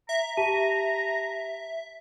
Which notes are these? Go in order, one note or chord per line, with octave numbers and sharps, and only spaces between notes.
E5 A#5
G4 A5 D#7